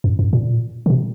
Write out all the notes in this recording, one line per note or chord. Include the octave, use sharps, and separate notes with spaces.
F#2
F#2
A#2
D3
B2